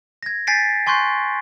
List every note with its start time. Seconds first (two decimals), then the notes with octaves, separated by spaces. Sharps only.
0.23 G#6 A#6
0.47 G#5 G6 A6 B6 C7 D7
0.87 G#5 C6 C#6 F#6 G6 C7